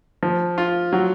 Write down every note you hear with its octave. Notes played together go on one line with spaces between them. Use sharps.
F3
F4
F#3